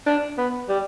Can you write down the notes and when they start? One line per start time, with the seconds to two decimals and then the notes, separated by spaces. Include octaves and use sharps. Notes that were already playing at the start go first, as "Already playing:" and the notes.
0.07 D4
0.38 B3
0.69 G3